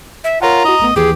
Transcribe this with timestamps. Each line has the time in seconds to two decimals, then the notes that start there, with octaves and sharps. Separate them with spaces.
0.24 E5
0.42 F4 A#4 C#5 F#5 A#5
0.65 E4 F#4 D#5
0.80 A1 A3 B3
0.96 D#2 E3 G4 G#4